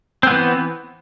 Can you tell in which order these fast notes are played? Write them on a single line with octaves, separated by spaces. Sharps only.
C4 B3 E3